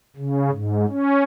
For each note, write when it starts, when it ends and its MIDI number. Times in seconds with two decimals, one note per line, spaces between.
0.16 0.51 49
0.52 0.85 44
0.89 1.23 61